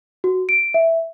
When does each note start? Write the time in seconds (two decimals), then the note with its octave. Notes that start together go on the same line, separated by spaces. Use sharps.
0.24 F#4
0.49 D7
0.74 E5